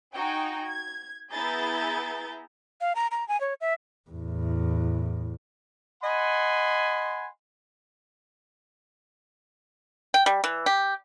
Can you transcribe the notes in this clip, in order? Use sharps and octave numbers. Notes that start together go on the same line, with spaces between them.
D#4 F#4 G5 G#5
G#6
B3 E4 G#4 A#5 G6 A6
F5
A#5
A#5
G#5
C#5
E5
E2 A2
D#5 F#5 G#5 B5 C6
G5
G3
E3
G4